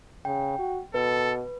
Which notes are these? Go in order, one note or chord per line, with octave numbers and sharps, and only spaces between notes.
C#3 G5
F#4
B2 A4 B4